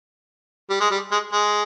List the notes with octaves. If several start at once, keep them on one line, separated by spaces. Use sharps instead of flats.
G3
G#3
G3
G#3
G#3